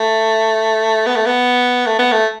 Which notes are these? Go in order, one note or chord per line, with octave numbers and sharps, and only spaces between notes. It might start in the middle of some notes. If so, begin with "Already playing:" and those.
Already playing: A3
B3
A3
B3
A3
B3
A3